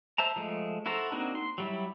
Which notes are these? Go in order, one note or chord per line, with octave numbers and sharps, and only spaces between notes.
C5 E5 A5 A#5
F3 G#3 A3
E4 F#4 A4 C5 A#5
A#3 C4 D4 D#4 F#4
C6
F#3 G3 E4